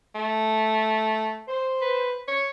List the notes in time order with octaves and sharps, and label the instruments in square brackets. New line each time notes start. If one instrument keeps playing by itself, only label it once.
[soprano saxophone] A3
[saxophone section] C5
[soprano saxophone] B4
C#5